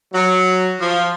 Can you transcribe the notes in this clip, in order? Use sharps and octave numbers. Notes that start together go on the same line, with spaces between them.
F#3
F3